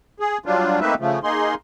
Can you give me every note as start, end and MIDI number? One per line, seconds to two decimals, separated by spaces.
0.20 0.38 68
0.46 0.80 54
0.46 0.80 55
0.46 0.80 62
0.46 0.80 65
0.81 0.94 57
0.81 0.94 58
0.81 0.94 60
0.81 0.94 63
0.81 0.94 71
0.81 0.94 76
0.99 1.19 49
0.99 1.19 53
0.99 1.19 57
1.23 1.55 58
1.23 1.55 63
1.23 1.55 68
1.23 1.55 84